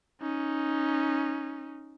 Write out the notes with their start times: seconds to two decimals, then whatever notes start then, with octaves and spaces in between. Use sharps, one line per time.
0.22 C#4 D#4